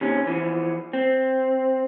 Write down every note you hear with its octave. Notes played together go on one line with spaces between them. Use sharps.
D#2 C3 C#4
E3 F3 B3
C4